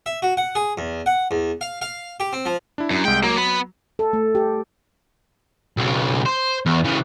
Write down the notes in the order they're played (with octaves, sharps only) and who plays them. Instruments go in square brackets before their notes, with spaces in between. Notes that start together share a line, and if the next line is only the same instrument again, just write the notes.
[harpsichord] E5
F#4
F#5
G#4
E2
F#5
E2
F5
F5
G4
C4
F3
[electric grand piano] D4 E4
[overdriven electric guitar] F#2
[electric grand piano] C2 G#3 [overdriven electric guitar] G5
[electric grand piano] F#3 [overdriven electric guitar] A#3
[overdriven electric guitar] B3 B5
[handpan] A4
A3
G4
[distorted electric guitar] B1 C#3
C5
E2
C#3 E3